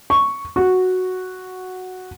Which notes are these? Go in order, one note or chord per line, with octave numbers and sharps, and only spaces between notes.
C#6
F#4